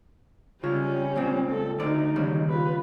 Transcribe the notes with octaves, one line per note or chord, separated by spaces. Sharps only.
C#3 G3 C#4 F4 C#5
C#2 A#2 C4
A4
D2 D#4 D5
D#2 C#3 G3
F4 B4